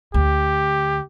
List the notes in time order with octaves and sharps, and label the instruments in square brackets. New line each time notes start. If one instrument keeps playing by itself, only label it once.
[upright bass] D2 [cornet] G4